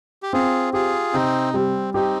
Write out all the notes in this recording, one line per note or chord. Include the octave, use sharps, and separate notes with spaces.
G4
C4 F4 G#4
F4 G4 G#4
C3 C4 D#4
G3 C4
C4 D#4 G4